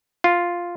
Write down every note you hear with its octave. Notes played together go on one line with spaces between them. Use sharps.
F4